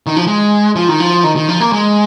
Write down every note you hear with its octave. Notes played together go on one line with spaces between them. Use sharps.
D#3
F3
G#3
F3
D#3
F3
D#3
D#3
F3
A#3
G#3